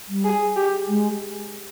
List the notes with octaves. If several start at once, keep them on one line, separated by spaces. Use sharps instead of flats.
G3
G#4
G4
G#3